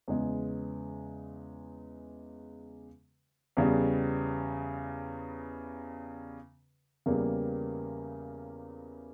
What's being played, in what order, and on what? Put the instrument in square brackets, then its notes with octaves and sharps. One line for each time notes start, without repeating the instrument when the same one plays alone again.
[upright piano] E2 C#3 G#3
E2 C#3 G3
E2 C#3 G3 A#3